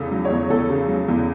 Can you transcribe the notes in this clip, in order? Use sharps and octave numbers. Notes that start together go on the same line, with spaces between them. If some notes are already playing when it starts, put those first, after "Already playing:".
Already playing: E2 C#3 A4
F#3
C#5
E2
E2 A4
C#3
F#3
E2